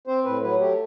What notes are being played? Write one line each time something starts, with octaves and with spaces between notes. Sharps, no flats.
C4 C5
A2 B4
F#3 B4
A3 G4